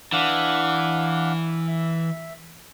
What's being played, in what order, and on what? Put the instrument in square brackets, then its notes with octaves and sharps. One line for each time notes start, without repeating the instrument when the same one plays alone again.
[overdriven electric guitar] E3 [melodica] D4 F5 F#5
[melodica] E5